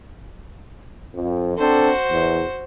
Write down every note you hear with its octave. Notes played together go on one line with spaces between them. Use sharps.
F2
C4 D4 F#4 A4 C5
E2